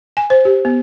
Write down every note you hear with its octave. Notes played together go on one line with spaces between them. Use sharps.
G#5
C5
G4
B3